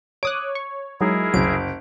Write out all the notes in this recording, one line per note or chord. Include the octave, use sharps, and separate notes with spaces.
C#5 D6 D#6 F#6
C#6
F#3 G#3 D#4 E4 G#4 A#4
F#1 C2 F#3 D7